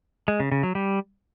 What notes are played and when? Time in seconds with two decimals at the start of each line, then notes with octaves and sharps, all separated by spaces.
0.28 G#3
0.40 C#3
0.52 C#3
0.63 F#3
0.75 G3